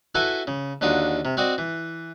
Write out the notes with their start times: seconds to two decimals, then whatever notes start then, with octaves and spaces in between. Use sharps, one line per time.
0.15 E4 F#4 A4 B4 E5 G#5
0.47 C#3
0.81 D#2 D3 F4 F#4 D#6
1.25 C3
1.37 C4 F#4 D5 D#5
1.58 E3